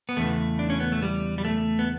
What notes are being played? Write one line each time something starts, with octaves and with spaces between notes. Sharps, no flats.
B3
E2 C#3 E3 A3
D4
C#4
B3
A3
G3
G3
A3
B3